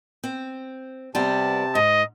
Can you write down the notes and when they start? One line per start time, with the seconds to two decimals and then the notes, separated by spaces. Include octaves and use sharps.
0.24 C4
1.15 C3 G3 B3 C4 A5
1.75 G#2 D#5